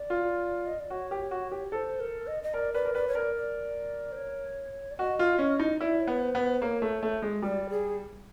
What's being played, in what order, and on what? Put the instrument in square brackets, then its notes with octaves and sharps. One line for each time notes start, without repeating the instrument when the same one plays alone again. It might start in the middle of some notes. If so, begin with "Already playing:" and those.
Already playing: [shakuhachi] D5
[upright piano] F4
[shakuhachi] D#5
D5
[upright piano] F#4 [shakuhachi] C#5
[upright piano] G4
F#4
G4
[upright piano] A4 [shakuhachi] C5
[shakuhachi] A#4
D#5
D#5
[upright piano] A#4 [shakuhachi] D5
[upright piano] B4 [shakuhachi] D5
[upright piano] A#4
[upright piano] B4 [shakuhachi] D5
[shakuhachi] C#5
[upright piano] A#4 [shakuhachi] D5
[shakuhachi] D5
C5
C#5
D5
[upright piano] F#4 [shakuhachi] D#5
[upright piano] F4
C#4
D#4
[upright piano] E4 [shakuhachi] D5
[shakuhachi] C#5
[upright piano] B3
[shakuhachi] C5
[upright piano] B3
[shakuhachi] C5
[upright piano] A#3 [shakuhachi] C#5
[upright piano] A3
A3
G#3
[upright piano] G3 [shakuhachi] D5
[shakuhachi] G#4